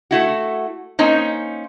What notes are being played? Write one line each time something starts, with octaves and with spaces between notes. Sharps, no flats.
A3 E4 F#4
A#3 C4 C#4 D#4